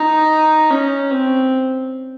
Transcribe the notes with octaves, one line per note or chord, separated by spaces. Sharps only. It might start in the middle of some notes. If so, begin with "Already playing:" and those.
Already playing: D#4
C#4
C4